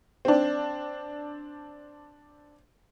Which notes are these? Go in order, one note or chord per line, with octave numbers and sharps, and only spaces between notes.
C4 D4